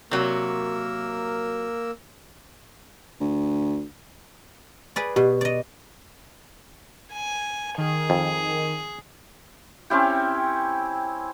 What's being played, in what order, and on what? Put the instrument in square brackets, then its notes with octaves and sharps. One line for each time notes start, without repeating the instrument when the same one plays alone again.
[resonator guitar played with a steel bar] C3 F#3 [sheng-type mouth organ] A#3 A#4 E6
[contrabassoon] D2
[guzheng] G#4 B4 D5
[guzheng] B2 [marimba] G4
[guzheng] D5 D#5
[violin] G#5
[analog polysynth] D#3 [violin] G#4
[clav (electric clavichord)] F2
[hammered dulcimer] C4 C#4 E4 G4